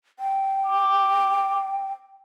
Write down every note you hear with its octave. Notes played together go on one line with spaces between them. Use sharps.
G5
D6